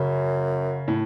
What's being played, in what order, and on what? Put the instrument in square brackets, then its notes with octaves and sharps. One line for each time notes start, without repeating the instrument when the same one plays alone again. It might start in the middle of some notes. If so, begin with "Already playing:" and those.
Already playing: [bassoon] F#2 [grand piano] C#3
[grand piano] A2